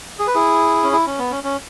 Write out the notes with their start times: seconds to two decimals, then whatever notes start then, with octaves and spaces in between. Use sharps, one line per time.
0.19 G#4
0.27 B4
0.35 E4 G#4
0.83 C#4
0.93 E4
1.06 C#4
1.19 B3
1.31 C#4
1.44 C#4